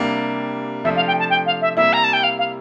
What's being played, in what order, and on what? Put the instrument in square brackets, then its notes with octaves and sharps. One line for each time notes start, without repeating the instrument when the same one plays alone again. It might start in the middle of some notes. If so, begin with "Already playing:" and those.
Already playing: [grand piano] C3 G3 A#3 D4
[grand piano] C3 F3 A3 D4 [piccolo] E5
[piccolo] F5
G5
A5
G5
F5
E5
[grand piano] C3 G3 A#3 E4 [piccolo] E5
[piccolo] A#5
A5
G5
F5
F5